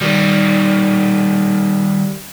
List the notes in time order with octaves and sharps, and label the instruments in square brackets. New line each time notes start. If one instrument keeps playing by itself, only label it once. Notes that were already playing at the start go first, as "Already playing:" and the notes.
[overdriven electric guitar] D#3 G3